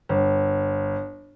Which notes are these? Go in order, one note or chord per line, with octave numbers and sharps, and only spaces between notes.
G1